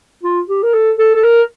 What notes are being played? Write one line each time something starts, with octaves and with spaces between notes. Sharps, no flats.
F4
G4
A#4
A4
A4
A4
A#4